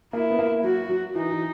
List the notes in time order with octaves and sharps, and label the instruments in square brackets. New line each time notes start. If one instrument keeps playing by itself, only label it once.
[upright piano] A#3 [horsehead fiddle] E4
[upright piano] B3
A#3
[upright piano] F#3 [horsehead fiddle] F#4
[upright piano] F#3
[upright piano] E3 [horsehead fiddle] D#4
[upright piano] E3